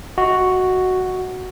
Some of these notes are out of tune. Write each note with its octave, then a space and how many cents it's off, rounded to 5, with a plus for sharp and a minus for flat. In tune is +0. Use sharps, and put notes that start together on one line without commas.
F#4 +0 D#5 +25